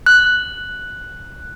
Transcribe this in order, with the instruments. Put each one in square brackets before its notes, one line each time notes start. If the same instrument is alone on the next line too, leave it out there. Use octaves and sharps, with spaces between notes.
[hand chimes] F#6